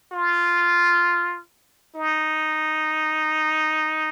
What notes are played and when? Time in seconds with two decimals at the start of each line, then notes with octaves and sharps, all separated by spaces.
0.13 F4
1.95 D#4